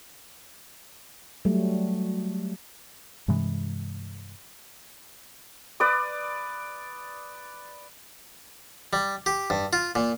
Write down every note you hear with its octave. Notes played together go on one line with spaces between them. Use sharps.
F#3 G3 A3
G2 C3 E3 G#3
B4 D5 D6 D#6
G3
G4
G2
F4
A#2